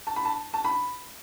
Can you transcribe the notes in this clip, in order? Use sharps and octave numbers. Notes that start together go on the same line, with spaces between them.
A5
B5
A5
A5
B5